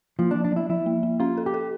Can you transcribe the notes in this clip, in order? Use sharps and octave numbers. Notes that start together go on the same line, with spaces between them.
F3 A#3
D4
F3
D4
F3 E4
F3 E4
A#3
A#3
C#4 F4
A4
G4
A4